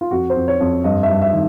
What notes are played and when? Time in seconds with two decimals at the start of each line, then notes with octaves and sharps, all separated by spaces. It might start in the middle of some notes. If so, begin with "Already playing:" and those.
0.01 F4
0.11 F2 F#4
0.30 C5
0.36 F2
0.48 C#5
0.60 F2
0.84 G2 D#5
1.03 E5
1.10 G2
1.22 E5
1.33 D#3